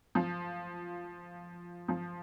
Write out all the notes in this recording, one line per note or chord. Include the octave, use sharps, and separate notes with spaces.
F3
F3